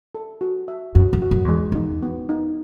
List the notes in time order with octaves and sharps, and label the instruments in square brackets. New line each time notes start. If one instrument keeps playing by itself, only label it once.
[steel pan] A4
F#4
E5
[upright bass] F#2 [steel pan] F#4
[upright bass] F#2
[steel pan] F#4
[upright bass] F#2
[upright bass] E2 [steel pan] G#3
[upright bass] E2 [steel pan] D#4
[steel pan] B3
D#4